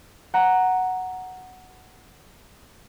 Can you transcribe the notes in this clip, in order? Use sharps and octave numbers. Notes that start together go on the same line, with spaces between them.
F#5 A#5